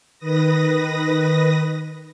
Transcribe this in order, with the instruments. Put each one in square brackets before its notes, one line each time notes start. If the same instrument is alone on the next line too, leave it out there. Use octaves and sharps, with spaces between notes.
[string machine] D#3 B4 D#6 A#6